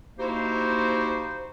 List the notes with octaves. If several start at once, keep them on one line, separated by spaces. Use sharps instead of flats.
A#3 D#4 E4 F#4 G4 C5